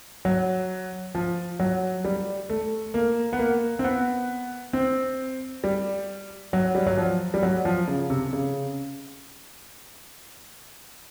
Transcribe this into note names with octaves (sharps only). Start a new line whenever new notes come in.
F#3
F3
F#3
G3
A3
A#3
B3
A#3
C4
B3
C4
G3
F#3
G3
F#3
F3
G3
F#3
F3
C#3
C3
C#3